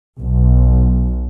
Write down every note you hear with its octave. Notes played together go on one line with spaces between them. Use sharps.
B1